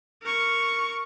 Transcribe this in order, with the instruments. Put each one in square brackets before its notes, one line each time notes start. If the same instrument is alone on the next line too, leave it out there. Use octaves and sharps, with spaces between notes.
[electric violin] A#4 C#6